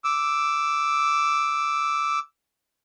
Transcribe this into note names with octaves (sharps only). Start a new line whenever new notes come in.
D6 E6